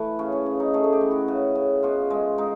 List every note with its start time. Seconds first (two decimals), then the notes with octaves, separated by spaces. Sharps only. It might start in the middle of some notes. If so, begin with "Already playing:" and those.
Already playing: E3 A3
0.19 C#3 C#4
0.32 C#4
0.46 C#3
0.60 D#4
0.74 A3 G#4
0.84 G#4
0.93 G4
1.01 E3
1.11 F#4
1.28 C#3
1.55 C#3
1.83 B2 F4
2.10 G#3
2.38 G#3 D#4